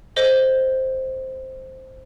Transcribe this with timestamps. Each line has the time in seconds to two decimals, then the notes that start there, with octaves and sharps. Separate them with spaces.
0.16 A4 C5 D#5 G7